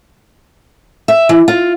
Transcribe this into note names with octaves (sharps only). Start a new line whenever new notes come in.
E5
E3
F4